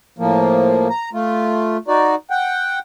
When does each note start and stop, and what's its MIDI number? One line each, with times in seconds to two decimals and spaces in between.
0.19 0.88 45
0.19 0.88 53
0.19 0.88 58
0.90 1.09 82
1.13 1.77 57
1.13 1.77 65
1.88 2.15 63
1.88 2.15 66
1.88 2.15 74
2.30 2.79 78
2.30 2.79 79